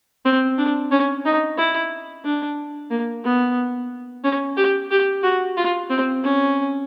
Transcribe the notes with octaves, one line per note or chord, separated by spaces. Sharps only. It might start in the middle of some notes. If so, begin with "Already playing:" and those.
C4
D4
C#4
D#4
E4
D4
A#3
B3
C#4
G4
G4
F#4
F4
C4
C#4